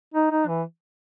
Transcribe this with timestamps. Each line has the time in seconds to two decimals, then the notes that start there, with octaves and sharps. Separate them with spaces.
0.14 D#4
0.31 D#4
0.47 E3